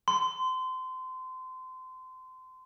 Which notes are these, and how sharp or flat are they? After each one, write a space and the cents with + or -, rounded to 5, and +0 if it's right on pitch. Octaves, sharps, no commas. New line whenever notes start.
C6 -25